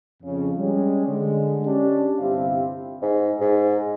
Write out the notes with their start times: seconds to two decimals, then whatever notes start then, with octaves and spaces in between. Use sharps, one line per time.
0.23 F2 C#3
0.57 G3 G#3 C#4
1.07 D3 G#3
1.64 C#4 D4 G4
2.19 G1 C3 C4 E4 G4 F5
3.02 G#2
3.41 G#2